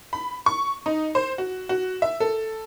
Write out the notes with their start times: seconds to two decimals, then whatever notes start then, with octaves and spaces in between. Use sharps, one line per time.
0.13 B5
0.46 C#6
0.86 D#4
1.15 C5
1.38 F#4
1.69 F#4
2.02 E5
2.20 A4